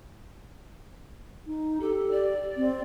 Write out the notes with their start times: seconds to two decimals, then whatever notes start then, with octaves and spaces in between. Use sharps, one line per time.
1.47 D#4
1.81 G4 A4
2.11 D5
2.57 C4